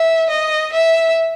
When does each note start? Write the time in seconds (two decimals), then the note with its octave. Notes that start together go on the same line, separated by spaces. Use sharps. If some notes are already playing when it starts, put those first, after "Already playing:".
Already playing: E5
0.30 D#5
0.73 E5